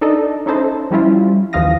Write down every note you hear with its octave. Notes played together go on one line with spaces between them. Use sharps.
D4 D#4 A4 D5 D#5
C#4 D#4 E4 A4 C5 D#5
F3 G3 C#4 E4 F4
D#2 E3 F3 F5 D#6 A#6